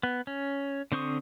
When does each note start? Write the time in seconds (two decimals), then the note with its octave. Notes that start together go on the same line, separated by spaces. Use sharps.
0.03 B3
0.27 C#4
0.92 D3 C4 C5 C#6 D#6